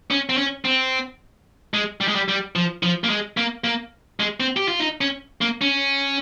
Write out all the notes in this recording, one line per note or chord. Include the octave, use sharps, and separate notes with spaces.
C#4
C4
C#4
C4
G#3
G3
G#3
G3
G3
F3
F3
A#3
G#3
A#3
A#3
G#3
C4
G4
F4
D#4
C#4
A#3
C#4